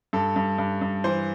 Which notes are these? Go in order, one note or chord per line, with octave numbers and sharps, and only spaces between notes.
G2 A4
G2
G2
G2
E3 C5